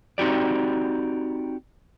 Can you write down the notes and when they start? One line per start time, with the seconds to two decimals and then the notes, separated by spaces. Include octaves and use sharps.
0.18 C4 D#4 F#4 G4 D5